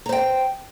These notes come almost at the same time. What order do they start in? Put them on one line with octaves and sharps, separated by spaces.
A#5 C5 G5